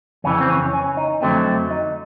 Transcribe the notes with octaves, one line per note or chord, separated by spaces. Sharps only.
F2 C#3 E3 C#4
C4
C#4
C#4
D#4
F2 D3 F#3 A3 C4
D#4